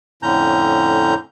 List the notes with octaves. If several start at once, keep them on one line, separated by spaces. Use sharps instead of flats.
F2 A2 D3 C#4 A#5 G6